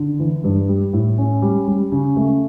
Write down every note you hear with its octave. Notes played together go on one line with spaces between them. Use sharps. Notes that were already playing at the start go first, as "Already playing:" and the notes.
Already playing: D3
E3
G2
G3
A2
C#4
G3
G3
C#3
A3